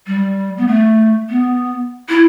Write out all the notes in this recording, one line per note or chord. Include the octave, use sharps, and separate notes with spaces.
G3
B3
A3
B3
E4